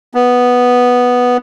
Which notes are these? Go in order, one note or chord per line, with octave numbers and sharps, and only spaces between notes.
B3